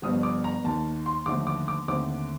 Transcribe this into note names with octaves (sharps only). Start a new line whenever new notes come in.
G1 G2 F3 D#6
D6
A#5
D#2 D#3 A#3 A5
C6
D#2 D3 F3 A3 D6
D6
D6
D#2 D3 A3 C4 D6